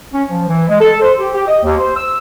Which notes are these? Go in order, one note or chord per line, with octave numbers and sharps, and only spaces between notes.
C#4
F3
E3
G#3
A4
C5
G4
G4
D#5
D#2
C5
E6